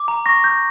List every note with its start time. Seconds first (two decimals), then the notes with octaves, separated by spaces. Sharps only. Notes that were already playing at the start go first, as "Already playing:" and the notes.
Already playing: D6
0.08 A#5
0.26 C#6 A#6
0.44 G6